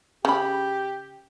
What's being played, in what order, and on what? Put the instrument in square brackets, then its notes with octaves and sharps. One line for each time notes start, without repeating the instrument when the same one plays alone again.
[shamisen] C#3 B5 [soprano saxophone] G4